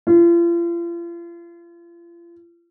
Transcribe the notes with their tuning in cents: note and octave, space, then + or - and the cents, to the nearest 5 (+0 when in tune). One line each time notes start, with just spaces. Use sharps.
F4 -40